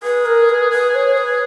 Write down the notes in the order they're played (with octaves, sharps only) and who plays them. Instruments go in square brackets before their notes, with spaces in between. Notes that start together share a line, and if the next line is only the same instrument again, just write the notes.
[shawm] G#4 [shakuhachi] B4
[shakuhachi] A#4
B4
B4
C#5
B4